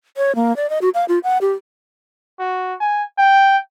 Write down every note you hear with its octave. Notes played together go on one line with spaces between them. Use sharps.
C#5
A#3
D5
D#5
F#4
F5
F4
F#5
G4
F#4
G#5
G5